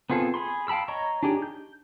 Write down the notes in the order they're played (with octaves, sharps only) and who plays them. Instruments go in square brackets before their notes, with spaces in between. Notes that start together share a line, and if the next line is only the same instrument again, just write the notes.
[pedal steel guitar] B3 C4 F4 G#4 A4
G#4 B5 C6
F5 G5 A5 B5 E6
C#5 D#5 A#5 C#6
D4 D#4 G4 G#4
G6